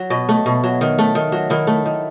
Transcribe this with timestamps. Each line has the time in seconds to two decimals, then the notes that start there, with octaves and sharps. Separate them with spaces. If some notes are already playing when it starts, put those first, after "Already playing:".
Already playing: F#3
0.10 B2 D#5
0.29 A3
0.46 B2
0.64 F#3
0.81 D#3
0.99 A3
1.15 D#3
1.32 F#3
1.50 D#3 E4
1.67 A3
1.85 D#3